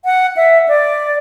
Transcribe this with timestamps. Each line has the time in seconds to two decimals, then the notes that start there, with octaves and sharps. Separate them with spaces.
0.05 F#5
0.37 E5
0.68 D5